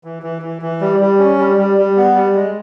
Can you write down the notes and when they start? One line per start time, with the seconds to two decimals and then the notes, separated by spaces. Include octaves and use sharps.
0.04 E3
0.23 E3
0.42 E3
0.62 E3
0.81 G3
1.00 G3
1.19 C#4
1.38 G3
1.57 G3
1.78 G3
1.97 B3
2.15 G3
2.35 G#3